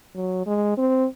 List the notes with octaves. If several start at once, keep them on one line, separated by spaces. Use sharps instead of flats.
F#3
G#3
C4